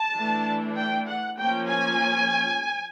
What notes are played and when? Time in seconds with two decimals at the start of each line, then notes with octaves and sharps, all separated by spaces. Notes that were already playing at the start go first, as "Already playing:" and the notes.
Already playing: A5
0.13 E3 A3 D4
0.77 G5
1.07 F#5
1.38 F3 A#3 C#4 G5
1.69 G#5